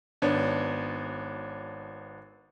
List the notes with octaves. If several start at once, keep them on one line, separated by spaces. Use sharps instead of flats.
G#1 B3 D4 C#5